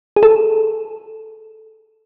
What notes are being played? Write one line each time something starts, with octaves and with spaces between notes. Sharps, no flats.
G#4
A4